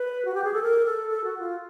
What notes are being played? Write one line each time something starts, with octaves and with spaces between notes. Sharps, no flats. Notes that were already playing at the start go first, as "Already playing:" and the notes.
Already playing: B4
F#4
G4
G#4
A4
A#4
A4
A4
F#4
F4